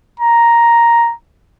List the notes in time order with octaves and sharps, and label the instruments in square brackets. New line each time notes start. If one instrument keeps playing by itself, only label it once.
[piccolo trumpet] A#5